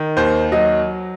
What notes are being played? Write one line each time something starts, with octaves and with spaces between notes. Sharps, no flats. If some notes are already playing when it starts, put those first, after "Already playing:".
Already playing: D#3
D#2 C5
F#3 D#5